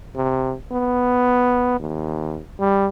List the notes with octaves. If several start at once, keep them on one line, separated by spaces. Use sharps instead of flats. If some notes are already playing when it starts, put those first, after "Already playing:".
C3
B3
D#2
G3